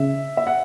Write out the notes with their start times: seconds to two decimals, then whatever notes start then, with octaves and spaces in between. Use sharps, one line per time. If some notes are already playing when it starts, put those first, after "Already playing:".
Already playing: C#3 E5
0.37 E5
0.47 F#5